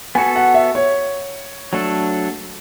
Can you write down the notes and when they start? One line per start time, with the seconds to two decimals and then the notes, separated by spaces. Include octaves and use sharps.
0.15 B3 F#4 A4 G#5
0.36 F#5
0.54 E5
0.75 C#5
1.73 F#3 A3 D4 A4